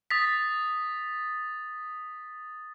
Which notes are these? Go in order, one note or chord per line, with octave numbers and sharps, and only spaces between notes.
D#6 A6 B6